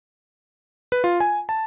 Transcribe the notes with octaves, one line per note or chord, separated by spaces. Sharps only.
B4
F4
G#5
A5